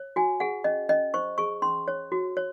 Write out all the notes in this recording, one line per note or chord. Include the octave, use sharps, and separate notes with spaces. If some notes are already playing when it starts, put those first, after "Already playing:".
Already playing: C#5
F#4 G#5
G#4 F#5
C#4 D#5
C#4 D#5
C5 C#6
G#4 C#6
C#4 C6
C#5
F#4
C#5